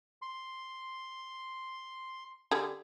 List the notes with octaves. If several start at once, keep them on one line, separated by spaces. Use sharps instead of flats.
C6
D3 G3 G#4